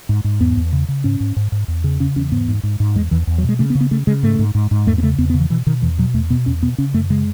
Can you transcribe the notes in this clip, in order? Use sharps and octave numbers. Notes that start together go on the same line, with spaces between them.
G#2
G#2
E2 B3
E2
C#3
C#3
G#2 C#4
G#2
G#2
G#2
E2
C#3
C#3 C#4
E2 C#4
G#2 B3
G#2
G#2
G#2
E2 G#3
E2 E3
E2
F#3
B2
G#3
C#3 A3
B3
C#3
B3
C#3 A3
C#3 G#3
G#2 A3
G#2
G#2
G#2
E2 A3
B3
C#3 A3
E2 B3
B3
C#3
E3
B2 E3
B2 D#3
E2 E3
B2 F#3
E2 A3
B2 B3
E2 C#4
B2 B3
C#3 C#4
F#2 A3
C#3 G#3